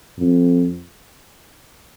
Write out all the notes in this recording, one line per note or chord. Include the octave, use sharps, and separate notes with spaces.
F2